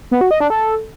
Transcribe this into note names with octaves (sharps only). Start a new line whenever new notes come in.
B3
F#4
D#5
D4
A4